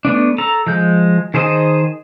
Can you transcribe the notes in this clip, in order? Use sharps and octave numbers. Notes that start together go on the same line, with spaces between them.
A3 B3 D4
A4 A#5
F3 G#3 G6
D#3 G#4 C5 D#5 A5